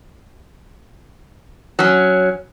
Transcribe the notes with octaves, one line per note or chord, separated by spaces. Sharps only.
F#3 C#4